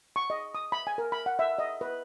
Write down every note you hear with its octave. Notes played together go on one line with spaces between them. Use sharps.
C#6
D#5
D#6
B5
G#5
A#4
B5
F#5
E5
D#5
B4